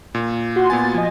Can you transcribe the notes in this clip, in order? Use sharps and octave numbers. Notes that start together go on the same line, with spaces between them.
A#2
F#4 C6
A#2 B3 G#5 A6
F3 D#5 G#5